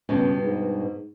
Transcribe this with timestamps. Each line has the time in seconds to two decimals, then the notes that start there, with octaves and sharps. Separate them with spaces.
0.09 C#2 G2 B2
0.44 G#2